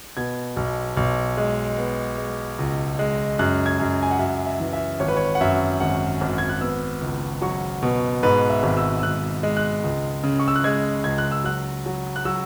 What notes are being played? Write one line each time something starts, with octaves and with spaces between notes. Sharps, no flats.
B2 G#6
B1
B1
G#3
B3
G#3
C#2
G#3
F#2 F#6
G#6
F#2
G#5
F#5
F#2 E5
E5
E3
E5
G#1 C#5
B4
C#5
F#5
F#2 E5
G#1 F#5
G#1
G#6
F#6
B3 E6
C#2
F#3 C#6
B2
G#2 B4
E5
G#1
E6
E6
G#1 F#6
G#3
F#6
C#2
C#3
C#6
E6
F#6
G#3 G#6
C#2 G#6
F#6
E6
F#3 F#6
F#3
F#6
F#3 E6